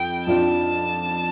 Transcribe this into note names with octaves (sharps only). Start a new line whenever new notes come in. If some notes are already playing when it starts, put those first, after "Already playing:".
Already playing: F2 G5
F2 F3 D4 F4 A5